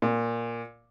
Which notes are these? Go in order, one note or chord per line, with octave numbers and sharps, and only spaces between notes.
A#2